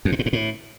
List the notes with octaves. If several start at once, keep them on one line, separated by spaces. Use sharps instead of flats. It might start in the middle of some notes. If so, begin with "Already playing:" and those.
F2
A#2
A2
G#2
A2